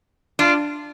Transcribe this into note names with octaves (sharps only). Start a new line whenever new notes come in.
D4 F4